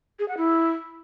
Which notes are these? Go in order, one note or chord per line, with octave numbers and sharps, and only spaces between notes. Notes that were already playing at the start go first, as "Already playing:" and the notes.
G#4
F#5
E4